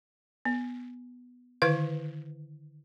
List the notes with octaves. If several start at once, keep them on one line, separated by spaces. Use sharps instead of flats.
B3
D3 D#3 E4 B4 F5